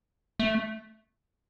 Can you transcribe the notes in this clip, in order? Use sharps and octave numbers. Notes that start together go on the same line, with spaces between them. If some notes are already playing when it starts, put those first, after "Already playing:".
A3